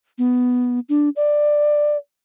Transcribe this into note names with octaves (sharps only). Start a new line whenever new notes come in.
B3
D4
D5